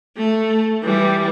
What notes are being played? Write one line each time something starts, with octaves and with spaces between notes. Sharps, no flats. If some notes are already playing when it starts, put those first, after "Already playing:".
A3
E3 G3